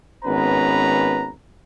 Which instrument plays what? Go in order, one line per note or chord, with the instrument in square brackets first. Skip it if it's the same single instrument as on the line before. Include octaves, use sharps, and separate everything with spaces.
[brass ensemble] G#1 B3 C#4 B4 A#5